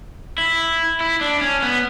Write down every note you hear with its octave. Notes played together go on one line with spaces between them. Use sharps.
E4
E4
D4
C#4
B3